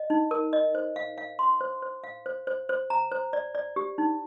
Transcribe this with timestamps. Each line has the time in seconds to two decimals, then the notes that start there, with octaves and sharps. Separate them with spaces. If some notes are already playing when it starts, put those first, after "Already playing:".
Already playing: D#5
0.10 D#4
0.31 A#4
0.53 D#5
0.75 C5
0.96 F5
1.18 F5
1.39 C6
1.61 C5
1.82 C5
2.04 F5
2.26 C5
2.47 C5
2.69 C5
2.90 A#5
3.11 C5
3.33 D5
3.55 D5
3.76 G4
3.98 D#4